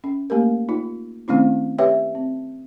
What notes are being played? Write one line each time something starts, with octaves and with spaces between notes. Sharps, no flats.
C#4
A3 A#3 G4 A#4
D#4 F4
D#3 A3 C4 C#4 E4
G4 B4 C#5 E5 G5
C4